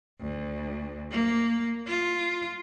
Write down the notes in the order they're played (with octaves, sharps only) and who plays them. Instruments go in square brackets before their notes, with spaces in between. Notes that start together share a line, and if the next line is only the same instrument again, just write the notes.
[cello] D2
A#3
F4